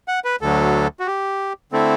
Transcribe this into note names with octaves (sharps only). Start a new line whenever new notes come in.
F#5
B4
D2 D3 F#3 A4
F#4
G4
D3 A3 C4 E4 A4